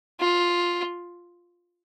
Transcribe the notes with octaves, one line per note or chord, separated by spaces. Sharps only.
F4